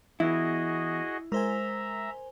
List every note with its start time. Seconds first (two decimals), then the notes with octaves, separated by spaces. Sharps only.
0.20 E3 B3 E4 F#4 G#4 D#5
1.32 G#3 A#4 C5 E5 G#5 A#5